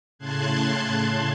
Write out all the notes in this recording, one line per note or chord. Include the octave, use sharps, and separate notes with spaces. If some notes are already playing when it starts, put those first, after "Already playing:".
A2 C#3 A5 C6 F#6 G#6